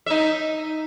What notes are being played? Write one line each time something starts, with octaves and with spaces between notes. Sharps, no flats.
D#4 E5